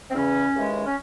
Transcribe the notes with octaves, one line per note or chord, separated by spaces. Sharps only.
C4
E2 C#3 E3 C#4
D#2 C#3 E3 G#3
C#4